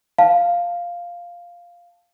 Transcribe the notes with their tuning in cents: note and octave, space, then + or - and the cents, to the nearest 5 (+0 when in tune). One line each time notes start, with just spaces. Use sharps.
F5 +0 A5 +0